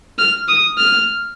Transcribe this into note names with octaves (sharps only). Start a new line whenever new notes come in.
F6
D#6
F6